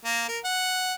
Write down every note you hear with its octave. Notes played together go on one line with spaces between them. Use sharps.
A#3
A#4
F#5